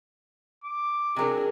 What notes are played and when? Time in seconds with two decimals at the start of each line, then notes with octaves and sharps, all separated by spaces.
0.64 D6
1.16 C3 F#3 D4 G#4 A#4